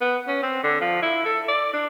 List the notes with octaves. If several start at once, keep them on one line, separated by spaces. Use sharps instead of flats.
B3
C#4
C4
D3
F3
E4
A4
D5
D4